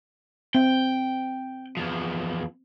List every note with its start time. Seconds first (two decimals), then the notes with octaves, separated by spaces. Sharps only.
0.55 C4 G5
1.77 E2 F3